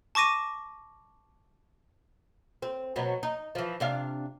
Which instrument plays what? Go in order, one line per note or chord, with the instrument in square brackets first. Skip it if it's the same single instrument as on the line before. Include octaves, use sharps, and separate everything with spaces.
[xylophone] A5 C#6 D6 A#6 D#7
[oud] C4
B2 F#3 B3
D#4
E3 F3
C3 D4 F5